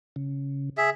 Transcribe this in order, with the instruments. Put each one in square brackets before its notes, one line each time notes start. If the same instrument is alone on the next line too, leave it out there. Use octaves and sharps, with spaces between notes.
[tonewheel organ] C#3
[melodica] G#4 E5